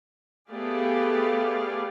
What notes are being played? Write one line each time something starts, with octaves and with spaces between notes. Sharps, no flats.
A3 B3 G4 G#4 D5 F5